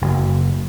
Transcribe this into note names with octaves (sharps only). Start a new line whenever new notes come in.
F#1